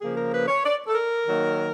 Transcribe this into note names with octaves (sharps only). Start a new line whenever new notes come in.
C#3 F3 A#3 G#4
A#4
B4
C#5
D5
A4
A#4
D#3 F#3 A#3